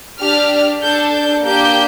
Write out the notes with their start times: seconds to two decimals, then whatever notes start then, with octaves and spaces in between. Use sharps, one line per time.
0.19 D4 G4 F6
0.81 D4 A4 G6
1.13 G6
1.44 A#3 D4 G4 G6